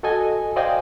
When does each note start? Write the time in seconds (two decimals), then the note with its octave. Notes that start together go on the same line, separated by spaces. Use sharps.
0.03 F#4 A4 D#5 G#5
0.56 C5 D5 D#5 F5 G5 G#5